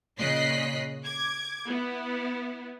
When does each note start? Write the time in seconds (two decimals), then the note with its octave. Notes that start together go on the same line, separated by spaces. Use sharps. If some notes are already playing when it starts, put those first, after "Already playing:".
0.19 A#2 C#3 D#5 F#6 B6 C7
1.04 D6 G#6
1.67 B3 E4